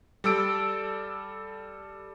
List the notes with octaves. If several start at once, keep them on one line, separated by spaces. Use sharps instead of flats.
G3 A4 E6 D7